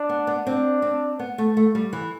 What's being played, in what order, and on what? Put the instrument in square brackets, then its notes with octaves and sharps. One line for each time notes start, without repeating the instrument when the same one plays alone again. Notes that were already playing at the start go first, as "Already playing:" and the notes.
Already playing: [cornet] D4
[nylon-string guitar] B3
B3
[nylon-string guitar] C4 [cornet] D4
[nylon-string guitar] C4
B3
A3
A3
G3
E3